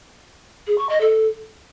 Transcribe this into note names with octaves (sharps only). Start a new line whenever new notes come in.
G#4
C#6
D#5
A4